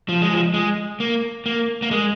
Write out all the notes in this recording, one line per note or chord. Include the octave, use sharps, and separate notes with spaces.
F3
G#3
F3
G#3
A#3
A#3
A#3
G#3